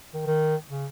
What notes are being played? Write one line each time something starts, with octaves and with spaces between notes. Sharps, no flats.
D#3
D#3
C#3